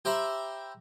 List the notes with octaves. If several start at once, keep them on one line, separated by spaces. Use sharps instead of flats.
G4 C5 E5 A#5 B5